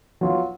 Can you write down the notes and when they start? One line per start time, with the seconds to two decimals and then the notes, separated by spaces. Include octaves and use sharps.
0.21 F#3 B3 F4